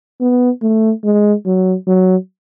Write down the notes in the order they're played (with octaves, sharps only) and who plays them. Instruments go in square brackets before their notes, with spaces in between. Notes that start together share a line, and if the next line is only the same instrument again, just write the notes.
[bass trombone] B3
A3
G#3
F#3
F#3